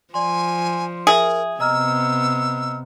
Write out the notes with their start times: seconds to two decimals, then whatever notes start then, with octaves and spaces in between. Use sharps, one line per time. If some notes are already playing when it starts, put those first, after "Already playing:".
0.14 F3 D5 G#5 C6
1.07 G#4 A#4 E5
1.60 C3 B3 D#5 A#5 E6 F6